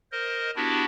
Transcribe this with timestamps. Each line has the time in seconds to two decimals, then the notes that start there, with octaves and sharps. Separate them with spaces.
0.12 A#4 C5 D#5
0.56 B3 D4 E4 F#4 G4